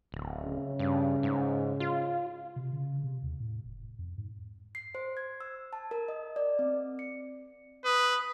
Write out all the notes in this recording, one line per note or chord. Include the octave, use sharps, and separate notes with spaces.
D1
C#3
G2
G#2
F4
C3
C#3
C3
D#2
A2
F1
F2
G#2
C7
C5
G#6
E6
A5
A#4
D#5
D5
C4
C#7
B4 D#6